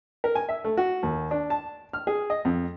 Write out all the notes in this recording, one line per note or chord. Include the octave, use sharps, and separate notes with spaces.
A#4
G#5
E5
A3
F#4
D#2
D4
A5
F6
G#4
D#5
F2